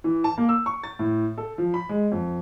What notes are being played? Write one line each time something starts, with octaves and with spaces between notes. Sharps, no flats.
E3
A5
A#3
E6
C#6
A6
A2
A4
F3
B5
G#3
F2